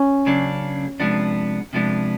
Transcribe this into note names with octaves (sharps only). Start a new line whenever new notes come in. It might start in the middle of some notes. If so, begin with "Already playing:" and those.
Already playing: C#4
C#3 F#3 A#3 D4
C3 F3 G#3 B3 D4
C3 F3 G#3 B3 D4